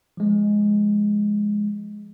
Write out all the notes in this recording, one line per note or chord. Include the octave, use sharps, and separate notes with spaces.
F3 G#3